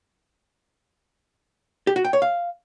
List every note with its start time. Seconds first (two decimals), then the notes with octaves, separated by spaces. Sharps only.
1.87 G4
1.96 F#4
2.05 G5
2.13 C#5
2.22 F5